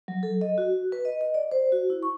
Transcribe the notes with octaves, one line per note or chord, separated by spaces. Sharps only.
F#3
A4
D#5
F#4
B4
D#5
D#5
D5
C5
F#4
E4
C#6